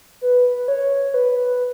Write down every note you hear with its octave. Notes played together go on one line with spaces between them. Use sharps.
B4
C#5
B4